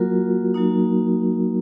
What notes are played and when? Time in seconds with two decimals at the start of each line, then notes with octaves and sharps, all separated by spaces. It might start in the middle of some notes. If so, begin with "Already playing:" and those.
Already playing: F#3 A#3 F4 F#4 A#4
0.54 F#3 A#3 D#4